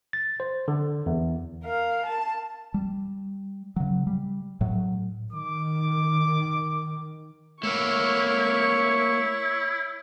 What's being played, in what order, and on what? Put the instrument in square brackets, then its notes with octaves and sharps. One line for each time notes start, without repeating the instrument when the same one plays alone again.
[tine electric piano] A6
C5
D3
E2
[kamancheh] A#4 F5
A5
[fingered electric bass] G3
C#3 F#3
G3
A2 F#3
[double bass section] D#3 [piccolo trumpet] D6
[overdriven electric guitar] A3 A#3 [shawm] E4 [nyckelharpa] C#5 C#6